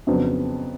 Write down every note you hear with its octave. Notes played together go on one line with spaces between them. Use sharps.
F2 C#3 F#3 B3 D4